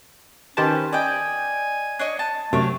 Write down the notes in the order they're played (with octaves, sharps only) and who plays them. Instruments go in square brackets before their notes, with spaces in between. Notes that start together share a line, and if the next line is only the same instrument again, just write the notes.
[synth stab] D#3 G4 A5 [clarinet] C#4 [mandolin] B4 C5
[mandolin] D5 D#5 G5 [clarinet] G#5
[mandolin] D4 C#5 D#5
A5
[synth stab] F#2 C3 [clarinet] A3 [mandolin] D4 C#5